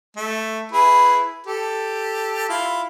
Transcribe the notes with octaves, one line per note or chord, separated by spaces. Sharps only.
A3
E4 G#4 B4
G4 A4
E4 F4